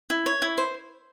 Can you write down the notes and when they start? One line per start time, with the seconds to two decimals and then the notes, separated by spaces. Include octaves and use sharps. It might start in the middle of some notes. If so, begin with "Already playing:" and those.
0.10 E4
0.26 C#5
0.42 E4
0.58 C5